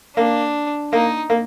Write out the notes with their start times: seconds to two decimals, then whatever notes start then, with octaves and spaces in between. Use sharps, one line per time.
0.16 A#3 D4
0.93 A#3 D#4
1.30 A#3